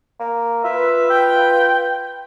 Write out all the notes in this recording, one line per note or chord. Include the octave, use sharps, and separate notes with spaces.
A#3
F4 B4 E5
G5